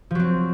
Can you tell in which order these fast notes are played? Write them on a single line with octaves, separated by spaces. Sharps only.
F3 F#3 C4